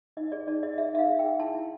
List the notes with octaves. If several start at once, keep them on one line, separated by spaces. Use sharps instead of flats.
D#4 D#5
G#4 D5
D#4 D5
G#4 D#5
G#4 E5
D#4 E5
F5
G#4
G5
G#4
E4 A5
E4